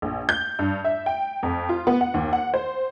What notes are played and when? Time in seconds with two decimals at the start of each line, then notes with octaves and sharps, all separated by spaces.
0.02 A#1
0.29 G6
0.59 G2
0.84 E5
1.06 G5
1.43 F2
1.69 F4
1.87 B3
2.01 F#5
2.14 D#2
2.33 F#5
2.54 C5